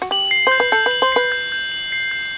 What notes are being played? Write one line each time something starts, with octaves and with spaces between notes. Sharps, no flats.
F#4
G4 F#7
C7
C5 G6
B4
A4 G6
B4
F#7
C5
B4 C7
G6
G6
F#7
C7
G6